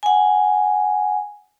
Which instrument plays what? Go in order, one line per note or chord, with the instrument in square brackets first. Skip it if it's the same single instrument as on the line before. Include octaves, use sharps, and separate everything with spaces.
[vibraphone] F#5 G#5